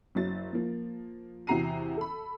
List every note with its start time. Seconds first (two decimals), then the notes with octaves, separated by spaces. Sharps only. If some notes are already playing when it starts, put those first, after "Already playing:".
0.15 F#1 F#3 A6
0.53 F3 A#3
1.47 E2 C3 F#4 A#5 C7 D#7
1.97 A4 B5